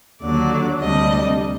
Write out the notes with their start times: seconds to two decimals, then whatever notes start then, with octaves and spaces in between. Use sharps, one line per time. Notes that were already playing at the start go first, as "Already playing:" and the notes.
0.21 D#2 D3 F#3 D5
0.80 D2 C3 G3 D4 D#5